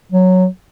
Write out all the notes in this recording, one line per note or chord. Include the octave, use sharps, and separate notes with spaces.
F#3